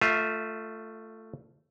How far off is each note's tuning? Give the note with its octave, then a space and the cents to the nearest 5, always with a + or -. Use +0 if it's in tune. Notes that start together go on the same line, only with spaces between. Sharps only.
A3 +10 F4 +0 E5 -20